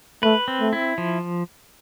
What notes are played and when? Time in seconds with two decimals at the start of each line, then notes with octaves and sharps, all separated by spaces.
0.23 A3 B4
0.48 C4
0.61 A3
0.73 E4
0.98 F3